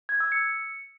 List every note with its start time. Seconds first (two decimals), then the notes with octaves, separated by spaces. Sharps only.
0.09 G#6
0.20 E6
0.32 C#7